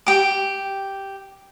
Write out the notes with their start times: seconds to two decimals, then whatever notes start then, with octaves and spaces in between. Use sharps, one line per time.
0.06 G4 D6